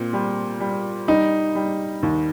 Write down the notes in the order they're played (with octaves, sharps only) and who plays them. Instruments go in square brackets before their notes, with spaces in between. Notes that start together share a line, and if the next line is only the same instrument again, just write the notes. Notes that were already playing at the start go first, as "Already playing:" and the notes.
Already playing: [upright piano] A#2 C4
G3
G3
[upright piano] G3 [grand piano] D#4
[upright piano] G3
D#2